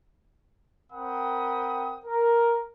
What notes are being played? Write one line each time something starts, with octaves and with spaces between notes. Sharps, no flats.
C4 A#4 F#5 G5 B5 D#6
A#4